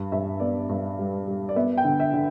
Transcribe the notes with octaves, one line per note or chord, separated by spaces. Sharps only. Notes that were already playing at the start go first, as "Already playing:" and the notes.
Already playing: G2
G2 E5
B3 D5
G2
G3
G3
D5
B3 E5
G5
D3
E5
D3